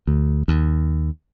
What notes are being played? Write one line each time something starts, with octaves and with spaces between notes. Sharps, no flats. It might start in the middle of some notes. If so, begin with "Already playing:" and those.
D2
D#2